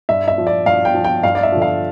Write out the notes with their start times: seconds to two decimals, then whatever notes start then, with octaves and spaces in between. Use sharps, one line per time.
0.09 G2 E5
0.28 E5
0.38 F3
0.47 D5
0.66 G2 F5
0.85 G5
0.94 F3
1.04 G5
1.23 G2 F5
1.35 D5
1.43 E5
1.52 D3 F3
1.62 F5